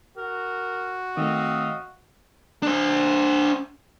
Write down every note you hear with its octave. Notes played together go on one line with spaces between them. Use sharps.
F#4 A#4
D#3 A3 C4 D#5 F5 D#6
D4 C5